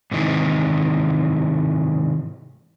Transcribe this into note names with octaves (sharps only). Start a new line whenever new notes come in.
G#2 C3 D#3 E3